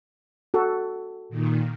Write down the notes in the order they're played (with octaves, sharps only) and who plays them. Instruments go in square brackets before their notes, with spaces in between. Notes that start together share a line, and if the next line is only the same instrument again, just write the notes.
[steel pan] F#4 A4
[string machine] A#2 D#3